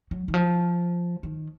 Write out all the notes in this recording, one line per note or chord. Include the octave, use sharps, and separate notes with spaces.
F#3
D#3
F3
D#3